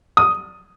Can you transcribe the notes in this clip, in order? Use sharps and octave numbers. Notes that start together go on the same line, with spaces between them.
D#6